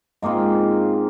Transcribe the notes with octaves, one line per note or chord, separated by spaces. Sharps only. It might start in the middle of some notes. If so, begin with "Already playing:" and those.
G#2 A#3 C4 F4